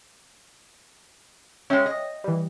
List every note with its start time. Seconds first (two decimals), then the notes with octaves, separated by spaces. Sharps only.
1.70 G#3 C#4 C#5 E5 G5
1.86 D#5
2.24 E3 G3